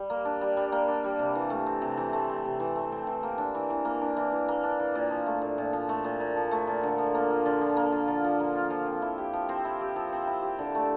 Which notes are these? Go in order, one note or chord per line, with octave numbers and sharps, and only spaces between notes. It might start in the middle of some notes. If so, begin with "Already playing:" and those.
Already playing: G3
A#3
D4
G3
G3
A#3
D4
G3
C3
E3
A3
C4
C3
E3
A3
C4
C3
E3
A3
C4
E3
A#3
D4
E3
E3
A#3
D4
E3
E3
A#3
D4
E3
A#2
F3
A3
A#2
A#2
F3
A3
A#2
A#2
F3
A3
A#2
D3
F3
A#3
F4
D3
F3
A#3
F4
D3
F3
A#3
F4
F3
C4
E4
G4
F3
C4
E4
G4
F3
C4
E4
G4
D3
A3